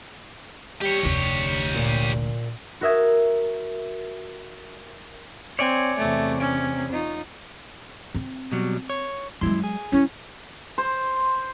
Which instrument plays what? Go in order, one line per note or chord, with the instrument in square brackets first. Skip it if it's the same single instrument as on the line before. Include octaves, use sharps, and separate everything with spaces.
[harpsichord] G3 [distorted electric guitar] G4 C#5
[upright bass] F1 D2 [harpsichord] D4
[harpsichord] A#2
[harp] F#4 A#4 E5 D#6 G#6
[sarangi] C4 [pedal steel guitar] C#5 D5 G#5
[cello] E2 C3 [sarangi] A3
[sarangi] C#4
[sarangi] D#4 [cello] F4
[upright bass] C4
[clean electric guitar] B2 F#3 G3
C#5
[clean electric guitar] F#2 E4 C6 [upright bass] F#3 G#3
[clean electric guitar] G#4
[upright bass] F#3 E4 [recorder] C#4
[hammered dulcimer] C5